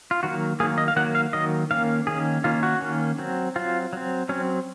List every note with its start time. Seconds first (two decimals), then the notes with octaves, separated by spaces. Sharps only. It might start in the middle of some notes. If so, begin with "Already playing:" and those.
0.11 F4
0.23 D#3 F#3 A#3 F#4
0.60 D#3 F#3 A#3 G#4
0.78 D#5
0.88 F5
0.96 D#3 F#3 A#3 F#5
1.15 F5
1.33 D#3 F#3 A#3 D#5
1.71 D#3 A#3 C#4 F5
2.07 D#3 A#3 C#4 G#4
2.44 D#3 A#3 C#4 F4
2.63 F#4
2.81 D#3 A#3 C#4
3.19 F#3 C4
3.56 F#3 C4 F4
3.93 F#3 C4
4.29 F#3 C4 C#4